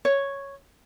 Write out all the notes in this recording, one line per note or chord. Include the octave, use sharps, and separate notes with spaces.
C#5